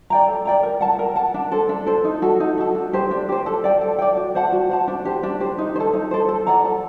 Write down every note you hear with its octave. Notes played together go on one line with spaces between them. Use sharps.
D5 G5 A#5
A4
D5 G5 A#5
A#4
F#5 A5
A#4
F#5 A5
D4
A4 C5
D4
A4 C5
D#4
F#4 A4
D#4
F#4 A4
D4
G4 C5
D4
G4 C5
A4
D5 G5
A4
D5 G5
F#4
C5 F#5 A5
F#4
C5 F#5 A5
D4
G4 C5
D4
G4 C5
D#4
C5
A4
D#4
A4 C5
A4
D5 F#5 A#5
A4